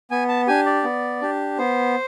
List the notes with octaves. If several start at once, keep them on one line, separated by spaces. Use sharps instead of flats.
B3 G#5
A5
D4 G4 G#5
D5
B3
D4 G4
B3 C5